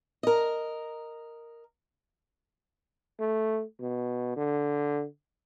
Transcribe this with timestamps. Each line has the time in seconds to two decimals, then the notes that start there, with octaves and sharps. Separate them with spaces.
0.23 A#4 D#5
3.20 A3
3.80 B2
4.36 D3